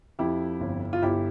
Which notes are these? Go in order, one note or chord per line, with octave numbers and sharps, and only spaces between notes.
F2 E4 G4
G1
F4
G1 E4 G4